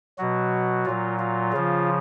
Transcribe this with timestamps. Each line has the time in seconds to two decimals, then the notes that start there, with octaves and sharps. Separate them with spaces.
0.18 B2 F#3 F#4
0.85 A#2 F#3 F4
1.19 F4
1.53 C#3 F3